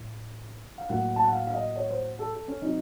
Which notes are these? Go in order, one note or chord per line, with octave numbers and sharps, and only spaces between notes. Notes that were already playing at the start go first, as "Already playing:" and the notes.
Already playing: A2
F5
A2 F#3 A#3 F#5
A5
F#5
F5
F5
D#5
C#5
C5
A4
A4
C#4
C3 F#3 C4 D#4